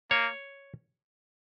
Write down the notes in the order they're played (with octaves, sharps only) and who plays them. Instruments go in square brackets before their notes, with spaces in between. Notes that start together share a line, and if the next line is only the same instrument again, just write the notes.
[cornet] A#3 [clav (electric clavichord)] C#5